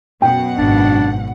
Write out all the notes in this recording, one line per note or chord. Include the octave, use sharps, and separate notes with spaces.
F#2 B2 F#5 G5
G#1 D4